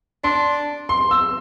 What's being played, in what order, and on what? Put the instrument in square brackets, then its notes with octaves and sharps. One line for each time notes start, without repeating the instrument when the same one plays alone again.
[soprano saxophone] D4 [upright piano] C6
[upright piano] C6
E6